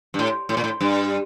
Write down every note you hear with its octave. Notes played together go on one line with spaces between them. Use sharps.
G2
A2
A2
A#2
A2
G2